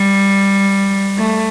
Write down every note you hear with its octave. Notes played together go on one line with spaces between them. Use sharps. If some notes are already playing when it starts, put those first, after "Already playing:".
Already playing: G3
A3